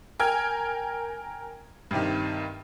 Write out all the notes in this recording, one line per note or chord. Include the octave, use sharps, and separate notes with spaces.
A#4 G5 G#5 F6 G#6
G2 C3 D#3